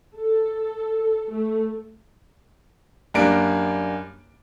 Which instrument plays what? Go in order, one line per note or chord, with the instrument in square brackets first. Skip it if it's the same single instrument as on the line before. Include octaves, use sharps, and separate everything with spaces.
[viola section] A4
A3
[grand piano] F#2 G3 A#3 D4 D7